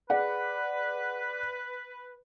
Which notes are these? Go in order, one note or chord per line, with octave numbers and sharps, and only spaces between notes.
G#4 B4 D5 F#5